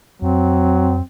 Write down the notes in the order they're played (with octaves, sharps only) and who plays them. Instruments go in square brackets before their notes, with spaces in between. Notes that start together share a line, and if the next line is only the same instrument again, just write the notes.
[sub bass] F2 [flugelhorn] F#3 [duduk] C4